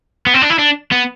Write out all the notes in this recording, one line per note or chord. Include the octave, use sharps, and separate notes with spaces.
B3
C4
D4
E4
D4
B3